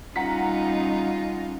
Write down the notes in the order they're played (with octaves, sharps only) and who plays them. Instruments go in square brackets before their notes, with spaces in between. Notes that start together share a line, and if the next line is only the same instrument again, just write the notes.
[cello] G3 D#4 [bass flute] C#4 [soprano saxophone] F4 [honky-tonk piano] F#5 A#5 B6